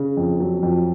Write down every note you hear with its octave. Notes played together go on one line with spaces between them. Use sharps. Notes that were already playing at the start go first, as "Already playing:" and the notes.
Already playing: C#3
F2
F#3
F2